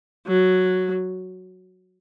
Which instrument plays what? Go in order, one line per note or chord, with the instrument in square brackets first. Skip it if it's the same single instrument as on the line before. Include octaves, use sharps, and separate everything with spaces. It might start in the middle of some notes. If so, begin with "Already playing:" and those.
[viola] F#3